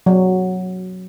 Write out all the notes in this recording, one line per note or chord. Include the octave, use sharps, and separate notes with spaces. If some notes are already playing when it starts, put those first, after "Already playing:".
F#3